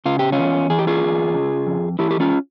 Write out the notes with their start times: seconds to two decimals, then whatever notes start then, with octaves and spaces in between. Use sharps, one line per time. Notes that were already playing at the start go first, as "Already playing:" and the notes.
0.06 C#3 F4
0.19 G4
0.32 C#4 F4
0.38 E2
0.70 E3 G#4
0.79 G4
0.87 F4 G#4
1.02 E2
1.34 C#3
1.67 F2
1.99 E3 E4 G4
2.11 G4
2.20 C#4 F4